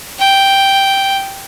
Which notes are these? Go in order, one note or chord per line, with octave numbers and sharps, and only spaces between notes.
G5